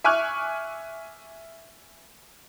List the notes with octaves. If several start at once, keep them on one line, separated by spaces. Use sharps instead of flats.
E5 G#5 C#6 D6 F6 F#6